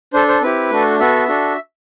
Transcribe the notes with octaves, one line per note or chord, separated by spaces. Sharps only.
D4 A4 C5
C5
C4 E4 G4 B4
A3 D4 F#4 A4
B3 F#4 A4 E5
D4 F#4 A4